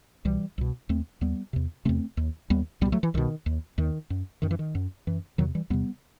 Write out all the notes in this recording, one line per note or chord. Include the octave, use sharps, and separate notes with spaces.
C2 B2 E3 G3
C2 B2
D#2 A3 C4
D#2 G3 B3
E2 C3
E2 C3 A3 C4
D#2
D#2 G3 B3
C2 B2 G3 B3
F#3 A3
E3
C2 B2 D#3
D#2
D#2 D#3
F#2
F#2 D#3
E3
D#3
F#2
F#2 E3
E2 C3 D#3 F#3
E3 G3
E2 C3 G3 B3